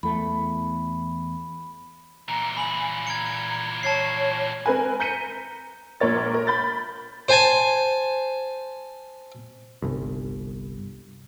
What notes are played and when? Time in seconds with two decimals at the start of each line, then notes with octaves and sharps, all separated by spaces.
0.03 E2 A3 B5
2.29 A#2 E3 A#5
2.57 G#5 B5 F#7
3.07 A#5 G#6 C#7
3.83 C#5 A5 G#6 C7
4.66 C4 A#4 B4 G#5
5.00 A#5 G6 B6 C#7 D#7
6.00 A#1 A#2 A#4 C#5 A6
6.34 A#4
6.47 B5 G6 A6
7.29 C5 G#5 A5
9.82 G1 C2